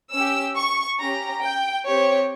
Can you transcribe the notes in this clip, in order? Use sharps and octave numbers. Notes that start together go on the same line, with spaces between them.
C#4 G4 E6
C#6
C#4 G4 A#5
G5
C4 G4 C#5